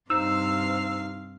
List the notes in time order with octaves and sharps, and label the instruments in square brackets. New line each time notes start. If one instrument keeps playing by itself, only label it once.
[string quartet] G2 C3 F5 [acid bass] D#4 [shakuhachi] C5 [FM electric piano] E6